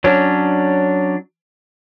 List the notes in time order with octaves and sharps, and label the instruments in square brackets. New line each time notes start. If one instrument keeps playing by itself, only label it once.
[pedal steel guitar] F#3 C#4 D4